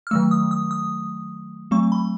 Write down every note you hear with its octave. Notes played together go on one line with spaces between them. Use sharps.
F6
D#3 F#3 A3 E6
D#6
D#6
D#6
F#3 A3 C4 C#6
B5